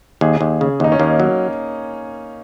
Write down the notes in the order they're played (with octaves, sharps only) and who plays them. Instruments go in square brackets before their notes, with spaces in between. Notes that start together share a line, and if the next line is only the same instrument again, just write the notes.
[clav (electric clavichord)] D#2 [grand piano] G#4
[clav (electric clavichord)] D#2
C#3
[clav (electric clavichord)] D#2 [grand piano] D#4
[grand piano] C#4
[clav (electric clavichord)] D#2 [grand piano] A#3
[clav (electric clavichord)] F#3